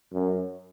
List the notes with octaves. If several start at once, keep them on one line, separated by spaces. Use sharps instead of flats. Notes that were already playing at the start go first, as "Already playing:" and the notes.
F#2